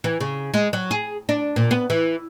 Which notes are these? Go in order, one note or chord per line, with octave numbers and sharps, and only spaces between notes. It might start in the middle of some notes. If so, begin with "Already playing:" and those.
E3
C#3
G#3
F#3
G#4
D4
A#2
B3
E3